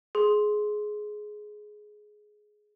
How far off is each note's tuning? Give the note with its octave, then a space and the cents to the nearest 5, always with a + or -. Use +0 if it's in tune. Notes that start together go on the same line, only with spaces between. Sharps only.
G#4 +15 C6 +0